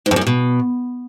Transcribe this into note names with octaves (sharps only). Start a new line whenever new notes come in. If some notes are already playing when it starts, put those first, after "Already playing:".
G#2
F2
F#2
A#2
B2